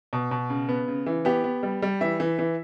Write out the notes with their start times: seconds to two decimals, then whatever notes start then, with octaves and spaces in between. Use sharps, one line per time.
0.13 B2
0.31 B2
0.50 C#3
0.69 B3
0.88 C#3
1.06 E3
1.25 B3 G4
1.44 B3
1.63 G3
1.82 G3
2.01 E3 E5
2.20 E3
2.39 E3